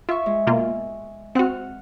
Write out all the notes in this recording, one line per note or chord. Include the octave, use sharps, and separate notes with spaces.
F4 E5 C#6
G#3
B2 A#3 F4
C4 F#4 F#5 F6